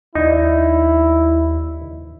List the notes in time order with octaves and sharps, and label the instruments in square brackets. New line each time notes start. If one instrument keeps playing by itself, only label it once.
[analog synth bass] D#2 [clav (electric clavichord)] D#4 [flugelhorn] E4 [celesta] D5 D#5